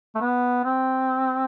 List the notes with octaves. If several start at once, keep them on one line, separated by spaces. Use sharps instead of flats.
A3
B3
C4